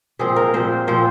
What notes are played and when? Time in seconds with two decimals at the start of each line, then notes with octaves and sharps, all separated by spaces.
0.19 A#2 F3 C4 G#4
0.36 A#4
0.53 A#2 F3 C4 C5
0.87 A#2 F3 C4 C5